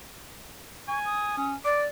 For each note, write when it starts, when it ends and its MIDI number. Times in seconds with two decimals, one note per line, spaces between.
0.88 1.36 80
0.88 0.99 85
1.05 1.47 87
1.37 1.56 61
1.65 1.85 74
1.65 1.81 86